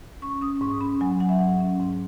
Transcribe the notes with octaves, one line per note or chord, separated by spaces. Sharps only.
C#4 C#6
C#4 D#6
G#2 C#6
C#4 B5
F#3 G#5
F#3 F#5
E5
G#2 F#5
C#4
G#2